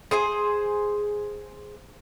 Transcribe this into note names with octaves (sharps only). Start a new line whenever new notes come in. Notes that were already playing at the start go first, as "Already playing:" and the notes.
G#4 C5 G#5